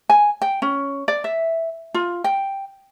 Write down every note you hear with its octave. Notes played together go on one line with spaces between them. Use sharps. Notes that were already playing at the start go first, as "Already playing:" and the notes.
G#5
G5
C#4
D5
E5
F4
G5